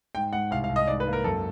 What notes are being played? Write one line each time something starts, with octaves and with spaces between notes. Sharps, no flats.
G#2 G5
G#2 F#5
C2 F5
F5
C2
D#5
G#2 D5
B4
A#3
A#4
F#2 A4